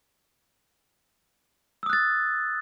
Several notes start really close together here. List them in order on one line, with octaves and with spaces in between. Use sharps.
E6 D#6 F#6 A6